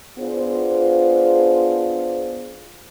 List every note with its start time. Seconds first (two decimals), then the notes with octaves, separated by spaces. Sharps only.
0.18 B3 D4 F4 G#4 C5